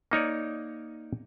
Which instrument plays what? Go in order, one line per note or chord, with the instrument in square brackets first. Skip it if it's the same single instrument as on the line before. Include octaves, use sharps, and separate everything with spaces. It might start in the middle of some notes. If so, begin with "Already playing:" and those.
[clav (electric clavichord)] A#3 D#4 C#5 D5